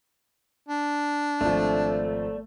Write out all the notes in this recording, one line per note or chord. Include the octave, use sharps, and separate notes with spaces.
D4
G#1 F3 A3 D5